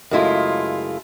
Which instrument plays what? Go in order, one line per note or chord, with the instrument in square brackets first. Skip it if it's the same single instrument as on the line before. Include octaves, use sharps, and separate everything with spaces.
[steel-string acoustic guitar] F#2 C#3 G#3 A3 E4 F4